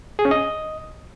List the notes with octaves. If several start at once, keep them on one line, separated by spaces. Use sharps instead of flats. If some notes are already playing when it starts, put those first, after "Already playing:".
G#4
C#4
D#5